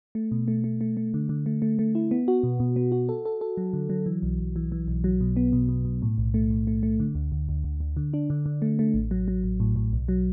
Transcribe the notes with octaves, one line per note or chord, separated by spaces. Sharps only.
A3
B2
A3
A3
A3
A3
D3
D3
A3
A3
A3
E4
B3
F#4
B2
B2
B3
F#4
A4
A4
A4
F#3
D3
F#3
E3
B1
B1
E3
E3
B1
F#3
B2
B3
B2
B2
B2
A2
B1
A3
A2
A3
A3
D3
D2
D2
D2
D2
D2
D3
D4
D3
D3
A3
A3
A1
F#3
F#3
A1
A2
A2
B1
F#3